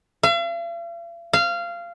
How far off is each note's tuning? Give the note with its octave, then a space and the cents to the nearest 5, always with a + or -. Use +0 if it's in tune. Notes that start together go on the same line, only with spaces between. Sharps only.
F5 -45
F5 -20